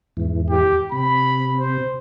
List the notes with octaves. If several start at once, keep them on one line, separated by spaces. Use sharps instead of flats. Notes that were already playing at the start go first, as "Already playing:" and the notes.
E2 G#2 E3
G4
C3 B5
C5